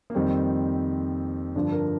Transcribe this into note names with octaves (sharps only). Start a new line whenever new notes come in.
A#3
F2 D#3 G3 C4
G2 D3 F3 D4
A#4